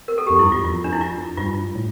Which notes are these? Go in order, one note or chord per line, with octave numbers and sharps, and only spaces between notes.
A#4
A4
F2 G4
G2 E4
E2 F4
F2 F4
D4
E4
F4
G2 F4
A2